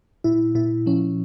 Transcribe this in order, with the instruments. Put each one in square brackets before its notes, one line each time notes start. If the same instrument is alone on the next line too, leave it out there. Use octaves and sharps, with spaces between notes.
[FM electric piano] A#2 E4
A#2 E4
F3 C#4